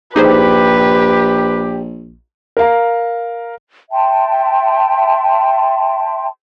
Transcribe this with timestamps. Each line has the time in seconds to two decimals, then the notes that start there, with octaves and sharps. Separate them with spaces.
0.16 A#1 D#4 G4 G#4 B4 C5
2.57 A#4 F5 A#5
3.91 E5 G5 A5 C6